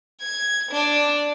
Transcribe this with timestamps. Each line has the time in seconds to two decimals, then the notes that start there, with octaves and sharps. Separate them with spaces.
0.21 G#6
0.72 D4